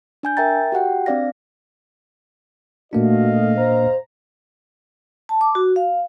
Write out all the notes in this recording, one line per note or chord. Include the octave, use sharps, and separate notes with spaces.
D4 G#5 G6
A#4 E5 G5 A#5 A6
F#4 G4 F#5 G5
C4 D4 D5 F5 A#6
A#2 A3 A#3 D4 F#4 D#5 F5
C5 A#5
A5
D6
F#4
F5